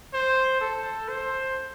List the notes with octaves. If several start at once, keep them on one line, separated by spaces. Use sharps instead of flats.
C5
A4
C5